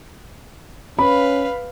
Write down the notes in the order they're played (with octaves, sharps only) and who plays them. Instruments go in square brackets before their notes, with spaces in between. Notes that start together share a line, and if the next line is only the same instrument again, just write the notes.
[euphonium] C#4 [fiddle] B4 F5 [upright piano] B5